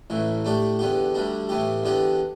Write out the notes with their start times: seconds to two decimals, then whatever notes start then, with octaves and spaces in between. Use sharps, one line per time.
0.10 A1 A2 E3
0.45 A2 A3 D4 G4
0.79 E2 D3 B3 G4
1.14 D2 D3 G3 D4
1.49 A2 E3 B3 G4
1.84 E2 D3 B3 D4 G4